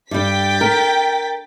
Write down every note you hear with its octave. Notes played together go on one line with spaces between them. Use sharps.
G2 G3 G5 A6 B6
A#4